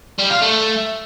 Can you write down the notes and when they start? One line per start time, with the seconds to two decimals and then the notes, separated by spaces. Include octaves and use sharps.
0.19 G3
0.30 F4
0.41 A3